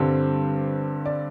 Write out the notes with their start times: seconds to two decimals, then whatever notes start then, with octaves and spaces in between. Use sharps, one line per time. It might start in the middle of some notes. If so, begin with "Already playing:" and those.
Already playing: G2 D3 G3 C4 C5
1.05 D5